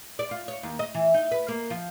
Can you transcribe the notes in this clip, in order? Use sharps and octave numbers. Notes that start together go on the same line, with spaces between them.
D5
F4
C#5
D#2
D#5
E3
D#4
B4
A#3
F3